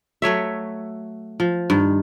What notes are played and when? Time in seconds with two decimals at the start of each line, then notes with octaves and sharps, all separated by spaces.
0.22 F#3 A3 C#5 E5
1.40 F3
1.70 G2 D#3